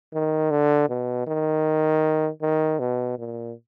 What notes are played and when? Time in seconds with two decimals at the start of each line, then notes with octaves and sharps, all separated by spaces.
0.14 D#3
0.51 D3
0.89 B2
1.27 D#3
2.42 D#3
2.80 B2
3.19 A#2